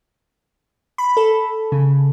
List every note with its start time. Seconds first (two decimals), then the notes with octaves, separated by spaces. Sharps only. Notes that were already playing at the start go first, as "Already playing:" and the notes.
0.98 B5
1.17 A4
1.72 C#3